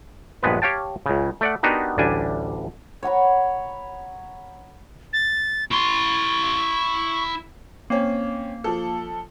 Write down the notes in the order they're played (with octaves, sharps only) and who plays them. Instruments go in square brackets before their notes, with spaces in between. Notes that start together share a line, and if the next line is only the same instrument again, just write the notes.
[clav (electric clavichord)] A#1 G2 G#3 B3 B4
G4 C#5 F5 G5 A5
C#2 C#3
A3 D5 F#5
B3 D4 D#4 F#4 G4 A#4
A1 D2 G3 D4 G#5
[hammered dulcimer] C#5 F#5 A#5 B5
[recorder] A6
[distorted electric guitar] E4 C6 [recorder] C#6
[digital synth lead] A#3 [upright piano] C4 C#4
[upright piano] F3 A4